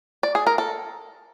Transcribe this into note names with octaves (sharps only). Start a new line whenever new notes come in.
D5
G#4
A#4
A4